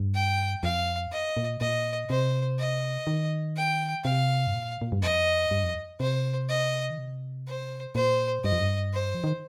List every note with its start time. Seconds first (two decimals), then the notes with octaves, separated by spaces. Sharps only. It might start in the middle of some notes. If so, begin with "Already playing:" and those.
Already playing: G2
0.15 G5
0.63 F2 F5
1.12 D#5
1.37 A#2
1.60 A#2 D#5
2.09 C3 C5
2.59 D#5
3.07 D#3
3.57 G5
4.05 C3 F5
4.47 G2
4.54 A#2
4.82 A#2
4.92 G2
5.02 F2 D#5
5.51 G2
5.63 F2
6.00 C3 C5
6.49 D#5
6.90 D#3
6.98 C3
7.47 C5
7.95 A#2 C5
8.44 G2 D#5
8.52 F2
8.61 G2
8.94 C5
9.15 F3
9.24 D#3